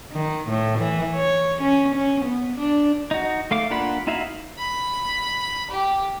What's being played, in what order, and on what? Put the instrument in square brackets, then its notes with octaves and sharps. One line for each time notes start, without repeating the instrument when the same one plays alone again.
[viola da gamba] D#3
A2
E3
C#5
C#4
C#4
B3
D4
[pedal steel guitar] D#4 F#4
A3 F5 D6
A#3 D4 F4 F#5 B5
D#4 E4 F#4 E5 F5
[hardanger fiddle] B5
G4